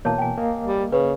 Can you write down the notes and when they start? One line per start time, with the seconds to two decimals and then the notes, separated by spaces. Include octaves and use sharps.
0.05 B2 E3 A#3 C#5 A5
0.18 G5 G#5
0.37 A#3 D#5
0.67 G3
0.92 C#3 B4